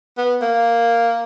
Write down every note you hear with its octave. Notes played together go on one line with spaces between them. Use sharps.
B3
A#3